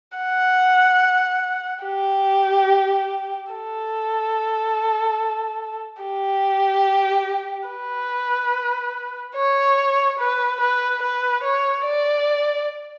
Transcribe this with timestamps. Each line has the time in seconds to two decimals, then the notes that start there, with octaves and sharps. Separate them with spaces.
0.17 F#5
1.84 G4
3.52 A4
6.02 G4
7.68 B4
9.36 C#5
10.19 B4
10.61 B4
11.03 B4
11.44 C#5
11.86 D5